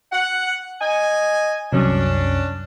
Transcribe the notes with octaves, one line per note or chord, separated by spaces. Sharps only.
F#5
D#5 G#5
C2 F#2 C#4 D4